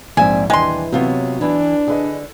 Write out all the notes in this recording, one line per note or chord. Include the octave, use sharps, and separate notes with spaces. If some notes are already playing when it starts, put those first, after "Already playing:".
A#1 G#2 C4 D5 E5 G#5
D#1 E3 G#3 D4 G5 G#5 C6
C3 F#3 B3 F4 C#5
E3 D4
D3 G#4 B4 D#5